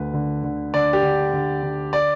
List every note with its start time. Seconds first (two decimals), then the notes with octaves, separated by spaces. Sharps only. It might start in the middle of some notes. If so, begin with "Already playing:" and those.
Already playing: D2 D3 B4
0.13 D3
0.44 D3
0.74 D3 D5
0.93 G4
1.03 D3
1.33 D3
1.63 D3
1.93 D5